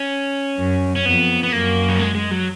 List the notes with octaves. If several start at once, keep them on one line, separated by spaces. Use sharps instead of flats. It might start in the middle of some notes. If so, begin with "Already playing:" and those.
Already playing: C#4
F#2
C#4
F2 B3
B3
F#2 A#3
F#3
G#3
G#3
F#3